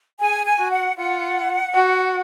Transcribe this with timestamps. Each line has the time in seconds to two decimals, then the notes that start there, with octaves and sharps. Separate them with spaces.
0.20 G#4 G#5
0.45 G#5
0.58 F#4
0.71 F#5
0.97 F4 F#5
1.74 F#4